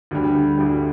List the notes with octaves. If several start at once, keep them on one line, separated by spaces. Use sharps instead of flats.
D2 D3 G3
D2 D3 G3